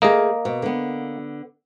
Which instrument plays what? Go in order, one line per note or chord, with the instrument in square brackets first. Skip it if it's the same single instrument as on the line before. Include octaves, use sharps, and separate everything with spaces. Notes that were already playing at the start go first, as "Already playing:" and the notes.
[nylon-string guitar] A3 G#4 [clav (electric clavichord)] A#3 D#5
[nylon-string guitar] B2
D3 B3